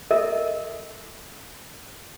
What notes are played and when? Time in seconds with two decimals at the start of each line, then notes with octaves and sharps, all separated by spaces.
0.11 A4 A#4 D#5 E5